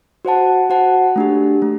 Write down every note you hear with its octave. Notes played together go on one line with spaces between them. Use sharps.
F#4 C5 F#5 A5
F#4 C5 F#5 A5
A3 D4 G4
A3